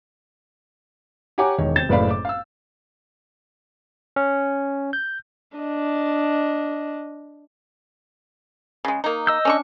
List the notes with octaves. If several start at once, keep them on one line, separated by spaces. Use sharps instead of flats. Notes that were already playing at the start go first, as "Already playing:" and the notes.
G4 C#5 F#5 G#5 A#5 D6
E1 D#3 C#5
C3 C4 G6 A6 E7
F#1 A2 B4 D5 F5 B5
D6
F5 E6
C#4
G6
D4 D#5
C#3 G#3
A#3 D#4
D#5 E6 G6
C#4 D4 C#6